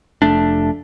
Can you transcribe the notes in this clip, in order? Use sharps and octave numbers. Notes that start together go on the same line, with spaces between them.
F1 A3 D4